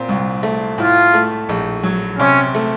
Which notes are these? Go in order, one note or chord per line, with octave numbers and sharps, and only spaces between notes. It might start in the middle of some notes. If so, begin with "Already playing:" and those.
Already playing: A#2 C4
C2
A3
A2 F4
A3
A#1
F#3
C3 C#4
A3